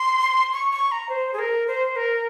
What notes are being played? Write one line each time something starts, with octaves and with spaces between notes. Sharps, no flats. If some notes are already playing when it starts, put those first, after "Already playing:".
Already playing: C6
C#6
C#6
A#5
C5
G#4
A#4
C5
A#4